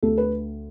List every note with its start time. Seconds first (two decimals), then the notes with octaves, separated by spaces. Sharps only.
0.03 D2 A4
0.18 B4